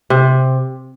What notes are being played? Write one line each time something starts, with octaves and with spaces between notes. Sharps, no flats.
C3